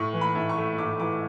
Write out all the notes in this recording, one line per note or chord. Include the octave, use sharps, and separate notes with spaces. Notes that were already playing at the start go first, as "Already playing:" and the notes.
Already playing: A2 C#6
E3
B5
A2
C#6
A3
A2 D6
E3 D6